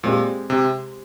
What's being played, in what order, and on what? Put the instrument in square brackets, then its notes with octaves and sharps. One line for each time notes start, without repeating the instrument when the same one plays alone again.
[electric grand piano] A#2 [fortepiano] G#3 C4 G4
[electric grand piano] C3